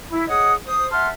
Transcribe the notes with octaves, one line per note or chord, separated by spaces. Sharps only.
E4
G#4 C#5 D#5 F#5 D#6
C5 D#6
E5 F#5 A5 C6 F6